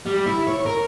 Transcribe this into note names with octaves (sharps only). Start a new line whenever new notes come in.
G3
E4
C#5
A#4